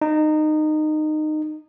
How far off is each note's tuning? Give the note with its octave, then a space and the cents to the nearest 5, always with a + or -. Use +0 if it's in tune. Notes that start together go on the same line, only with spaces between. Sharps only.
D#4 -20